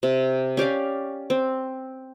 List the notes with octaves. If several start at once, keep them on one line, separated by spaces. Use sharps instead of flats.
C3
C#4 G4 D5 F5
C4